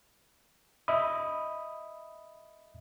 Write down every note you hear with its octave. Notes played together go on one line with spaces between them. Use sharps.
D#5 E5 B5 D#6